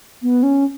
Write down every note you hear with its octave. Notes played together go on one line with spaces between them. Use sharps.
B3
C#4